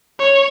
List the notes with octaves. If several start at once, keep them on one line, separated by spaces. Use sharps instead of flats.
C#5